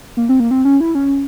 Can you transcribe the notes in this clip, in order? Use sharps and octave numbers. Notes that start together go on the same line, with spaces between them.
A#3
C4
A#3
C4
C#4
E4
C#4